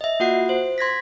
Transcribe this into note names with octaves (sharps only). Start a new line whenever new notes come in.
D#5 E5
A#3 F4 F#4 F#5 C7
C5
C6 G#6 A#6 B6